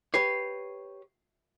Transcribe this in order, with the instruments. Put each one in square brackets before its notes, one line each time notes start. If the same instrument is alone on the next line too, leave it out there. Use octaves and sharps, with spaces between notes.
[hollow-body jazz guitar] G4 B4 C#5 [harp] C7